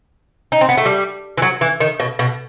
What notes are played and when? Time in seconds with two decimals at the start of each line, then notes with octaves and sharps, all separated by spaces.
0.52 D#4
0.61 C4
0.69 B3
0.77 A3
0.85 G3
1.38 E3
1.42 F#3
1.61 E3
1.80 D#3
2.00 B2
2.19 B2